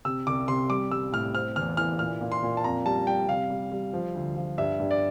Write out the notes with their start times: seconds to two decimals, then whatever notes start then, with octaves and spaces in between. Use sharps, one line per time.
0.05 C3 E6
0.27 C2 D6
0.48 C3 C6
0.70 G3 D6
0.91 G3 E6
1.12 A2 F6
1.35 C4 F6
1.56 E2 F6
1.77 E3 F6
1.99 A#2 F6
2.21 A#2
2.32 C6
2.43 A#2
2.57 A5
2.64 F2 A#5
2.85 G3 A5
3.07 G3 G5
3.28 C3 F5
3.50 G3
3.72 G3
3.93 F3
4.14 D2
4.37 F3
4.58 G2 E5
4.80 G2
4.91 D5